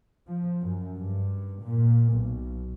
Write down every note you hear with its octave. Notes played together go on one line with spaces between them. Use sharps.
F3
F#2
G2
A#2
B1